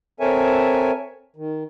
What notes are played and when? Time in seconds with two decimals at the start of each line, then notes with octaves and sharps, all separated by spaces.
0.20 C4 A4 A#4 C#5 E5 G#5
1.36 D#3